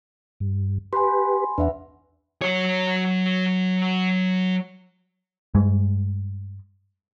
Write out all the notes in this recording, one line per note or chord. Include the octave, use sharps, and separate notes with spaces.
G2
G4 B4 G#5 B5 C6
E2 D4 B4 E5 F#5
F#3 C#5
G2 G#3